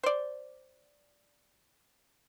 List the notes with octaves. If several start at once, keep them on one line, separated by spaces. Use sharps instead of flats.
C5 D5